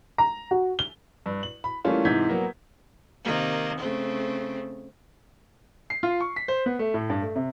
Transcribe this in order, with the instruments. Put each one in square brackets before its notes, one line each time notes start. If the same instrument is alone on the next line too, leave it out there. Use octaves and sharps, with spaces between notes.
[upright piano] A#5
F#4
G7
G2
F#7
B5
E3 G3 A3 A#3 C#4 F4
G#2 C3 E3 G6 G#6 B6
F#3 A#3 B3
[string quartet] C3 D#3 A#3
C#3 A3 C4
[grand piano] C7
F4
C#6
B6
C5
B3
A3
A2
G2
A3
C3